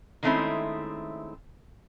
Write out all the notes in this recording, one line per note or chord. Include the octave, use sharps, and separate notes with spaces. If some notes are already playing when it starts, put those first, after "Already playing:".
D#3 G#3 A3 C4 C#4 E4